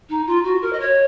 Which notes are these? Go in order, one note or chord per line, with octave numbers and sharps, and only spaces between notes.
D#4
F4
F#4
A#4
D#5
C#5